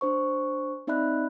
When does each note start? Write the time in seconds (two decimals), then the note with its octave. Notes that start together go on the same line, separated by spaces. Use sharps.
0.01 D4 C5 C#6
0.87 C4 D#4 D5 E5 B5 F#6